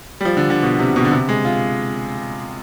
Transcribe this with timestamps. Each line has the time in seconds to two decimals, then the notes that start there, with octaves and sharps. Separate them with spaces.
0.21 G3
0.25 F3
0.37 D3
0.50 D3
0.63 B2
0.79 C3
0.96 B2
1.05 D3
1.12 C3
1.29 G#3
1.45 F4